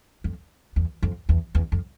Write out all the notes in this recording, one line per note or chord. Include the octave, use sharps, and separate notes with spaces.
F2
E2
F2
E2
E2
F2